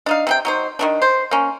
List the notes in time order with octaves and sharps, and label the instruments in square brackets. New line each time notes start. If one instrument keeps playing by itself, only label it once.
[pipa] D4 D#4 F5
C3 D#4 G5
F#3 D#4 C5
D#3 F3 D4
C5
A#3 C#4